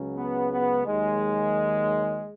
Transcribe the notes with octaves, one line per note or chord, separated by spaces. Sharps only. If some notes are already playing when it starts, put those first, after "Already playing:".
Already playing: C#2 C#3 F#3
B3
B3
D#2 D#3 F#3 G#3